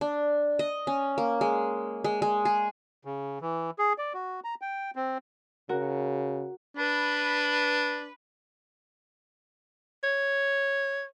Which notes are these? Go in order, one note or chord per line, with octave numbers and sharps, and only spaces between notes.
D4
D#5
C#4
A#3
G#3
G#3
G#3
G#4
C#3
E3
G#4
D5
F#4
A#5
G5
C4
C#3 F#4 A#4
D4 B4
C#5